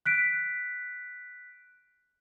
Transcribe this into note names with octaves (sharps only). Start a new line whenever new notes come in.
F#6 B6 D7